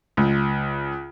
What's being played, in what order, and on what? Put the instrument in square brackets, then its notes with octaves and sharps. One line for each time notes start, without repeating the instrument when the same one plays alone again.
[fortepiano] C#2